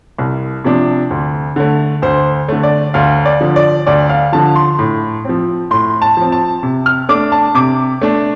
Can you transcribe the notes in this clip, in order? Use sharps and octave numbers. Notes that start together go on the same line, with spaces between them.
C2
C3 F3 D4
D2
D3 A3
D2 C5
D3 A3
D5
D2 F5
D5
D3 F3
D5
D2 D5
F5
D3 F3 A5
C6
A2
F3 C4
A2 C6
A5
F3 C4
A5
C3
F6
A3 D4 D6
A5
C3 D6
A3 D4